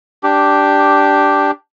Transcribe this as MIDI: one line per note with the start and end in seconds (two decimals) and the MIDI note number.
0.23 1.51 62
0.23 1.51 67